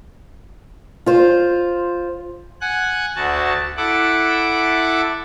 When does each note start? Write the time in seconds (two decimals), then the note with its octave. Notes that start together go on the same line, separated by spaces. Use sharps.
1.06 F4 C5
2.61 F#5 G#5 F#6
3.16 D2 F#4 A5
3.77 E4 A4 F#5 D6